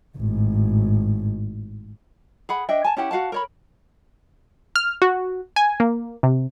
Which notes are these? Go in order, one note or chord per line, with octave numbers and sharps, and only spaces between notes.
G#1 A2
G#4 F#5 B5
D4 D#5 E5 G5
G#5 A5
C#4 E4 G4 F#5
F#4 F5 F#5 A5
A#4 C#5 B5
F6
F#4
G#5
A#3
C3